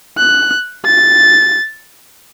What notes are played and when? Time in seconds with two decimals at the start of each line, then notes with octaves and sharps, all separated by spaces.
0.18 F#6
0.85 A6